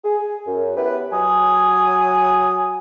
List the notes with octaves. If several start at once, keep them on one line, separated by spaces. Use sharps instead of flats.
G#4
F#2
B3 E4 G4 B4
F#3 G#5 D#6